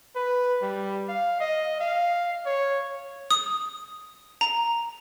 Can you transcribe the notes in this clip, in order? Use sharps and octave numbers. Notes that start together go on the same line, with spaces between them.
B4
G3
F5
D#5
F5
C#5
D#6
A#5